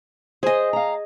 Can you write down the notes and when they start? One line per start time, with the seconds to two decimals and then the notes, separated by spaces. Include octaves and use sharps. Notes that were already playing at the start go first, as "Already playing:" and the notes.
0.43 G#4 C5 D#5 G#5
0.73 F5 A#5